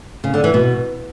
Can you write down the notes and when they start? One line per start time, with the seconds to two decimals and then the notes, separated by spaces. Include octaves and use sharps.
0.24 C#3
0.34 D3
0.44 E3
0.54 B2